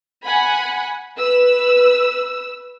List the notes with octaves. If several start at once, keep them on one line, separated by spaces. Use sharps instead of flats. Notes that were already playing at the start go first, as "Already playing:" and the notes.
F#5 G#5 B5
B4 E6